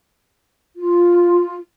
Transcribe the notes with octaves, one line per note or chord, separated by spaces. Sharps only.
F4